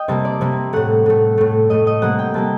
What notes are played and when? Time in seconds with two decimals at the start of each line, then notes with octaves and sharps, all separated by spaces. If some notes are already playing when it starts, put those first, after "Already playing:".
Already playing: D#5 G5
0.08 C3 G3 A#3 A5
0.25 D5
0.41 C3 G3 A#3
0.73 A2 A3 F#5
1.06 A2 A3
1.38 A2 A3
1.70 A2 A3 D#5
1.87 D#5
2.02 C3 G3 A#3 F#5
2.19 G5
2.34 C3 G3 A#3 A5